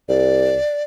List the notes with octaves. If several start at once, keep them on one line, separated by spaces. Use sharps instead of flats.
C2 D5